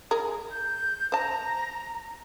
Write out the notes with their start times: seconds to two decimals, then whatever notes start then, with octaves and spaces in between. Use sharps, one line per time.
0.11 G#4 A#4
0.51 G6
1.12 C5 A5 A#5